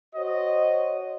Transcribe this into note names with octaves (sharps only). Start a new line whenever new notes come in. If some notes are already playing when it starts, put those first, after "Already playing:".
F#4 C5 C#5 D#5